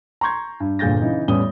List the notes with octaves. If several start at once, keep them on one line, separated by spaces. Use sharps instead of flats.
A#5 C6 C#6 G6 G#6
G2
G1 A#2 G#4 G6 A6 A#6
C#3 E3 D#4
A1 G3 B3 C#4 D#6 G7